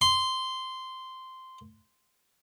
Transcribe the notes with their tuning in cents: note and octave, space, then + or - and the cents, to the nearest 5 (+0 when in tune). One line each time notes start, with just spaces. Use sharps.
C6 -10